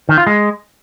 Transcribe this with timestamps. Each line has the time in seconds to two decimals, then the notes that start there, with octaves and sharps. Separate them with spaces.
0.09 D#3
0.18 F4
0.27 G#3